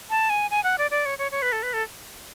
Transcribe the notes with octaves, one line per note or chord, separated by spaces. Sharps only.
A5
G#5
G#5
F#5
D5
D5
C#5
C#5
C#5
B4
A4
B4
A4